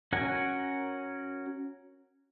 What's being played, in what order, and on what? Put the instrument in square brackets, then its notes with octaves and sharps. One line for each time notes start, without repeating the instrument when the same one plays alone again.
[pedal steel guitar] C#4 F#4 A#4 F#5 G#5